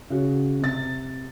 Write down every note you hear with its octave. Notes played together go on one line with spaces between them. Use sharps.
C#3 F#4
C3 A6